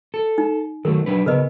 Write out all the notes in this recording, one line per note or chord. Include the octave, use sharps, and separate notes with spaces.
A4
D#4
D#3 F#3 A3 A#4
F#3 D4 B4
C#3 B3 A#4 B4 D#5